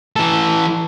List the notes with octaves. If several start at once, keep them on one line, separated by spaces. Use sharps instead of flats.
E3 A4